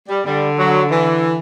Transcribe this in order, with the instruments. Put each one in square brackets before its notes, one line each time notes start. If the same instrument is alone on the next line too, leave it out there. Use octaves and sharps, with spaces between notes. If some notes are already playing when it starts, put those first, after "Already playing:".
[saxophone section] G3
[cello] D3 [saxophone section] G3
[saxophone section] F#3
E3